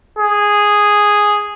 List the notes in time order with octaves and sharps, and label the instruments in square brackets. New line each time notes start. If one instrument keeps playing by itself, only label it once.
[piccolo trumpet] G#4